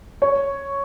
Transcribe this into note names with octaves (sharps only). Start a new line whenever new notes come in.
C#5